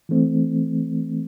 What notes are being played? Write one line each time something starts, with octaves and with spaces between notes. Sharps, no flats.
E3 A3 C4